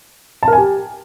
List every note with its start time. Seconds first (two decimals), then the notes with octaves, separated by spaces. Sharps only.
0.43 A5
0.48 A#4
0.53 G#5
0.58 G4